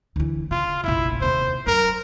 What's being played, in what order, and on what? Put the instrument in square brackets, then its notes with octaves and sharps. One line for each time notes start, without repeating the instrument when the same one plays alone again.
[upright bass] D2 E3
[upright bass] C#3 [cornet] F4
[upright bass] F1 A#1 [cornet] E4
[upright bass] D#2 C3 [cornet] C5
[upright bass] F#2 [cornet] A#4